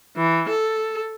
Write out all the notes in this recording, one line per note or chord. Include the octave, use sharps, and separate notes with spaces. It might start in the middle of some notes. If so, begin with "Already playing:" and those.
E3
A4